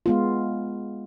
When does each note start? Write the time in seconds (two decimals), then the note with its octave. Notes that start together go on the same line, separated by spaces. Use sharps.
0.06 G#3 B3 F4